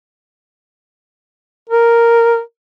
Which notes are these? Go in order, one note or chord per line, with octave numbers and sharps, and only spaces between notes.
A#4